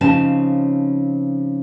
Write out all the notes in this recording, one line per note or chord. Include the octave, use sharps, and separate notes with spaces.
C#3 F3 C4 C#4 D#4 A5